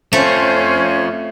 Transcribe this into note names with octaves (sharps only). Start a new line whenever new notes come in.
A3 C4 C#4 F4 C5